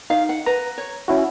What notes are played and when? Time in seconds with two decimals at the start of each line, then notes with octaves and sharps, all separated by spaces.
0.10 D#4 F5
0.29 F#5
0.46 B4 A#5
0.78 C#5
1.08 C#4 E4 F#4